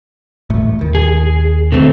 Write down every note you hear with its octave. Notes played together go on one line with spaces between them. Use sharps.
A1 A2 A3
D#2 D#3
G#4
B1 B2 D3 A3 C4